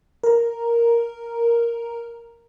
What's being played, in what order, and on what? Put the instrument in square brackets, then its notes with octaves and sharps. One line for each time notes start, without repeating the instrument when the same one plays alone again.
[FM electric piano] A#4 A#5